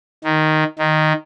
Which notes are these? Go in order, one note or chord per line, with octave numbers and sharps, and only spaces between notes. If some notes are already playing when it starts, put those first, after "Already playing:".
D#3
D#3